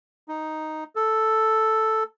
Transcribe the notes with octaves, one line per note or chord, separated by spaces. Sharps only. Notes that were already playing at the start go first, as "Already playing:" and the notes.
D#4
A4